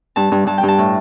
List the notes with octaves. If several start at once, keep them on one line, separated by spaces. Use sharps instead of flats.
G2 A5
G2
G2 A5
G5
G2
A5
A2